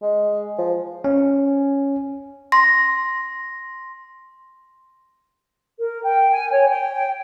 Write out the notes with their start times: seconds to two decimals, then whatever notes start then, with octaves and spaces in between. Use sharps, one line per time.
0.02 G#3
0.58 F3
1.04 C#4
2.52 C6 A#6
5.79 A#4
6.03 G5
6.31 G#5
6.52 C#5
6.70 G5